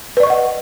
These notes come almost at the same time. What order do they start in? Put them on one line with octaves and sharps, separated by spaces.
B4 D5 C#6 D#5 F#5